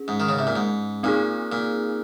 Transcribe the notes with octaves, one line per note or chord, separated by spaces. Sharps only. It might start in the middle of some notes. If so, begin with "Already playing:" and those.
Already playing: C#4 G#4
G#2
D#3
C#3
C3
A#2
G#2
A#2 C4 D#4 G#4
A#2